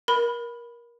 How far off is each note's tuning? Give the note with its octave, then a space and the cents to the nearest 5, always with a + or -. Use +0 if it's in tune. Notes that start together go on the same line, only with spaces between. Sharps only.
A#4 +20 B5 +0